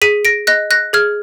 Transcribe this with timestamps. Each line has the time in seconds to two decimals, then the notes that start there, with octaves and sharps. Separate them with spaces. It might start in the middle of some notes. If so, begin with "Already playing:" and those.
0.02 G#4 B6 D#7
0.25 A#6 D7
0.47 D#5 F#6 A#6
0.71 F#6 A#6
0.93 G#4 F6 G#6